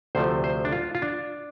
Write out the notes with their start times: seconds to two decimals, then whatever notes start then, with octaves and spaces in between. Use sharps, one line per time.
0.15 D2 C3 F3 A3 C5
0.44 C5
0.65 D4
0.72 F4
0.95 F4
1.02 D4